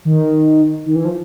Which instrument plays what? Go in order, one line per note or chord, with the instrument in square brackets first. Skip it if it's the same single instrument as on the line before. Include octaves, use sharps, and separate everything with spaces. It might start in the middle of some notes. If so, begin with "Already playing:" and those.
[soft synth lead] D#3
D#3
E3
F3